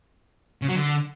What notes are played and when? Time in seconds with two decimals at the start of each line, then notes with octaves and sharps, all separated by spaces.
0.62 C#3
0.69 F#3
0.75 D3